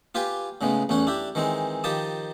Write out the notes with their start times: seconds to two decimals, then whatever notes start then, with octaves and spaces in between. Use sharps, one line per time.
0.15 F4 G4 B4 G#5 D6
0.61 A2 C#3 G#3 B3
0.89 A1 E2 C#4 C#5 F#5
1.07 D4 E4 G4
1.35 D#3 E3 G#3 C4
1.84 D#3 F3 G4 A5 D#6